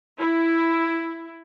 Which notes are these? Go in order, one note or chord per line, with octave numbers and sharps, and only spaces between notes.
E4